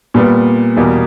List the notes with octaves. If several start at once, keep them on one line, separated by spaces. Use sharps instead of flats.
A#2 G3 B3
E2 B2 G3 A#3